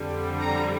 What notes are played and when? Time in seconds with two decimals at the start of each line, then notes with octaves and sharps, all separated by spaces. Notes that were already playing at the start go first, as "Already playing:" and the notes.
Already playing: F2 D3 G3
0.40 A#5